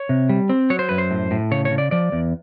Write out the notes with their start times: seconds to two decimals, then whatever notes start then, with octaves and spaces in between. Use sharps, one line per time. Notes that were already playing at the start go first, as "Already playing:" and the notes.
Already playing: C#5
0.09 C3
0.29 G3
0.49 C4
0.70 F#3 C#5
0.79 C5
0.89 F#2 B4
0.98 C5
1.11 A2
1.31 A2
1.51 C#3 C#5
1.65 C#5
1.71 C#3
1.78 D5
1.91 F3 D5
2.12 E2